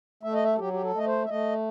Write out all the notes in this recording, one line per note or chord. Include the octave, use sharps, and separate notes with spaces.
A3 E5
D#5
E5
A4
F#3 G4
G4
A4
A3 D#5
C5
E5
A3 D#5